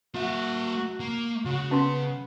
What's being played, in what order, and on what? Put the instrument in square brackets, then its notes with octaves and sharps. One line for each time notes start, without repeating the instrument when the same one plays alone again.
[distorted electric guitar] A#3 E5 [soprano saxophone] F#4
[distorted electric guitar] A#3
[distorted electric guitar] C#3 [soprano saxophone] F#4
[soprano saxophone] B3 [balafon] C#4 C6